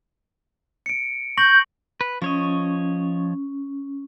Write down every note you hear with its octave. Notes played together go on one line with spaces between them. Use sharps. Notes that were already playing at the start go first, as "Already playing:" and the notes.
C#7 D7
C#6 G6 A#6 F#7
B4
F3 C#4 C#5 D#5